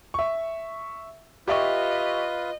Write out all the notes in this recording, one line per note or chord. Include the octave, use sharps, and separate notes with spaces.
E5 C#6
F4 G4 B4 D#5 E5 C#6